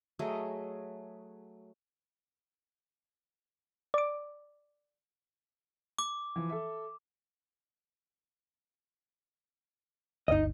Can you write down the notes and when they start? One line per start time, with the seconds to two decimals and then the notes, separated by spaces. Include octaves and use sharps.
0.19 F#3 A3 G#4 D#5
3.94 D5 D6
5.99 D6
6.36 E3 F3
6.49 A4 E5
10.28 G1 D2 D#4 D#5